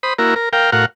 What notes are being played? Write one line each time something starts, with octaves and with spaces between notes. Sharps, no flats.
C5 B5 D#6
A#3 E4 F#4 A#4
A#4
A#4 F5 G5
A2 F#4 A#4 F5 F#5